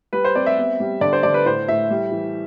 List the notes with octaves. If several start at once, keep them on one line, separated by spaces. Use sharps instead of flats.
G3 B4
C5
C4 D5
E5
B3
G3
D3 D5
C5
D3 D5
B4
A2 C5
A2 E5
G3
E3